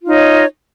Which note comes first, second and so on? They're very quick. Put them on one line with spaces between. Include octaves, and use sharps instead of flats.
F4 D#4 C#5 D#5